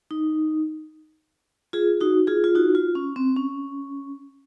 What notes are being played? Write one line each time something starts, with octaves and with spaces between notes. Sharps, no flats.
D#4
F4 G#4
D#4 F#4
F4 G#4
F4
D#4 F#4
F4
C#4
C4
C#4